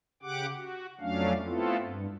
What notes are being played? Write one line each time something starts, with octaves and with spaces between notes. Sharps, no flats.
C#3 G4 F#5 D6
F#4
F2 F#3 A3 C#4 D4 F5
A3 B3 C4 E4 F4 A4
G2